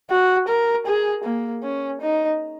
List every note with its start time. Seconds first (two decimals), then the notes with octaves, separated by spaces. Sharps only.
0.10 F#4
0.49 A#4
0.87 G#4
1.24 A#3
1.63 C#4
2.01 D#4